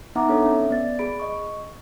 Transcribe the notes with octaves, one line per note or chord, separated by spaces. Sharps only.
B3 D#4 E5 F#5 A#5 D6
B3 D4 A4 C#5
C#4 E5
B3 D5 A6
G#4 B5 D7
D#5 C#6